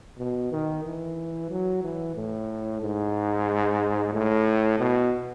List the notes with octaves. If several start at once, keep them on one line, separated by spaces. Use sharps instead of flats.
B2
D#3
E3
F#3
E3
A2
G#2
A2
B2